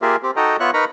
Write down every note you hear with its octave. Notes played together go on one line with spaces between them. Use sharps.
A#3 F4 G4 G#4 A#4 E5
C4 G4
D#4 F#4 A4 D#5 G5 A#5
B3 F4 C#5 E5 C#6 F#6
D#4 A#4 B4 A#5 B5 C#6